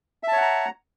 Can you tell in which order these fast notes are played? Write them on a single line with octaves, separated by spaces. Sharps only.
E5 A5 C#5 F#5 A#5